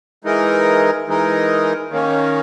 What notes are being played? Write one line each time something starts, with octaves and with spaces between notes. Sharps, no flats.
E3 G#3 D#4 A#4
E3 G#3 D#4 A#4
D#3 A#3 C#4